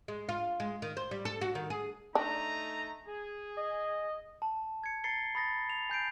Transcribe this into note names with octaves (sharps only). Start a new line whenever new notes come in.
G#3
F4
G#3
D#3
C5
G3
A4
F#4
D#3
G#4
A3 D4 D#4 A#5
G#4
D#5
A5
G#6 C#7
A#5 G#6 A6 C7 C#7 G7
B5 D#6 A6 A#6
F7
G#5 G6 C7 D7